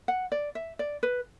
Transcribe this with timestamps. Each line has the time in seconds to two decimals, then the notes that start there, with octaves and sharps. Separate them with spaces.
0.08 F#5
0.32 D5
0.55 E5
0.79 D5
1.03 B4